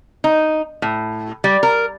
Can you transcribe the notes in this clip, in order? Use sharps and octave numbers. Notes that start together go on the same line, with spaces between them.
D#4
A2
G3
A#4